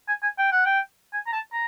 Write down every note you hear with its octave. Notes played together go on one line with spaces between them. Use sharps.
G#5
G#5
G5
F#5
G5
G#5
A#5
A5
A#5